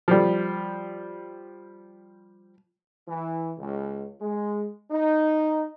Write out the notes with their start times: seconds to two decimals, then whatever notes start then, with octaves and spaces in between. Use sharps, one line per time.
0.08 F3 G3
3.06 E3
3.56 C#2
4.20 G#3
4.90 D#4